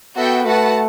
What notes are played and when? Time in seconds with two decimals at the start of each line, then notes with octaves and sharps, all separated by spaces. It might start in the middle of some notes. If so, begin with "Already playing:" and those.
0.16 B3 F#4 A4 E5 G5
0.45 A3 F#4 B4 F#5 A5